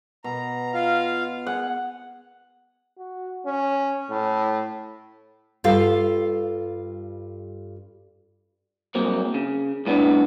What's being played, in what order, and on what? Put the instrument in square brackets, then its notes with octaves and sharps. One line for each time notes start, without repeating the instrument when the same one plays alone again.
[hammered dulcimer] B2 [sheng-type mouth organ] A#5
[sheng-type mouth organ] F4 F5
[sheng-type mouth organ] G#4 [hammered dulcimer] F#5
[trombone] F#4
C#4
A2
[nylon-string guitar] G2 F4 G4 A4 F5
[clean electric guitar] G2 F#3 A#3 C4
C#3
C2 A2 B3 D4